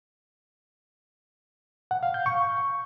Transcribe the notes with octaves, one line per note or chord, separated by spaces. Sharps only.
F#5
F5
G6
C#6